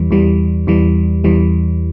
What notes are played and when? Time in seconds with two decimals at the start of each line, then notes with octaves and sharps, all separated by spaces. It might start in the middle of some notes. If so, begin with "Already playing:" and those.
Already playing: E2 E3 G3
0.11 E2 E3 G3
0.67 E2 E3 G3
1.24 E2 E3 G3